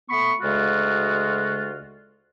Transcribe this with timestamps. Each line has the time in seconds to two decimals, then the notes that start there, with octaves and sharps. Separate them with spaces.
0.09 A3 B3 B5 C#6
0.41 D2 C#3 G#3 F4 F#4